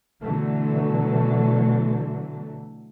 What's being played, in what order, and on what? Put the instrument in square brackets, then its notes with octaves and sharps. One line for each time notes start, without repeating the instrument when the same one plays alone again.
[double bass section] B2 D3 E3 F#3 A3